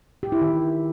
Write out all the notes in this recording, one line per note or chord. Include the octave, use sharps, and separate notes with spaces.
G4
E4
D#3